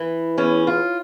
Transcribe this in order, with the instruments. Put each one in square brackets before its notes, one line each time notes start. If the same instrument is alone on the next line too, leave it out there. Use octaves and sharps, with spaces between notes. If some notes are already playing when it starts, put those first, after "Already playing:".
Already playing: [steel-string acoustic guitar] E3
E2 C#4
F4